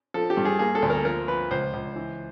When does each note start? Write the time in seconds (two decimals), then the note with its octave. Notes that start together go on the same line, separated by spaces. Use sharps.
0.14 F3 A4
0.30 G4
0.37 G2
0.45 G#4
0.59 A#3 G#4
0.75 A4
0.82 D2
0.90 A#4
1.05 F3 A#4
1.28 F3 B4
1.51 C#2 C5
1.73 C#2
1.96 E3